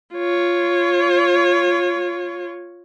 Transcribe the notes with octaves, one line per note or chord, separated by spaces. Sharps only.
F4 C#5